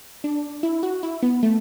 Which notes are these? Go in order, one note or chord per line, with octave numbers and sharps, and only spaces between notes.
D4
E4
F#4
E4
B3
A3